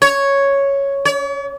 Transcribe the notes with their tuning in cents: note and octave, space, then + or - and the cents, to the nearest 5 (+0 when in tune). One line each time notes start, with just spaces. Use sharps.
C#5 +0
C#5 +45